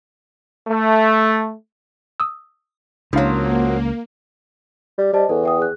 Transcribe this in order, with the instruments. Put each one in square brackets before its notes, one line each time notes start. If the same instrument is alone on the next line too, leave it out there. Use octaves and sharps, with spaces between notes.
[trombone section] A3
[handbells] D#6 E6
[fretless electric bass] C#2 [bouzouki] F3 F#3 [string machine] A#3 [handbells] D4 E4 F5
[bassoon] G3
[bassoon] G3 [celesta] C5 D#5 A5
[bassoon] E2 [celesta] A4
[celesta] E5 G5 D#6
G#4 F#6